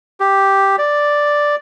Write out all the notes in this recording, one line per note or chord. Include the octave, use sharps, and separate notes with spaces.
G4
D5